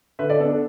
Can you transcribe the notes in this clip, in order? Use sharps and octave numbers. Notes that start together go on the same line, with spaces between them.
D3 B4 E5
A4 D5
B3 A4
D4
A4